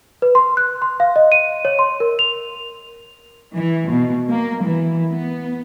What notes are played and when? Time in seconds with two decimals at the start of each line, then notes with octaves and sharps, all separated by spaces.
0.22 B4
0.35 C6
0.57 F#6
0.82 C6
1.00 F5
1.16 D#5
1.32 D#7
1.65 C#5
1.79 C6
2.00 A#4
2.19 F7
3.54 E3
3.90 B2
4.29 A#3
4.63 E3
5.11 B3